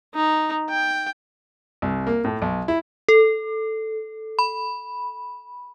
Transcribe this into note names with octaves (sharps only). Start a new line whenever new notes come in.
D#4
G5
C2
A#3
A2
B1
E4
A4
B5